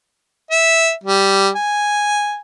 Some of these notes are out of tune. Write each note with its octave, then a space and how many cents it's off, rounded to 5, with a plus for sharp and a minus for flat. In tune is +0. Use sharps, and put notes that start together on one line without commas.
E5 -10
G3 -5
G#5 -5